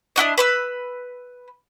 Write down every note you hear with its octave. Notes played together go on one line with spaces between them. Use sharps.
D4 E4 F#4 D#5
B4 B5 E6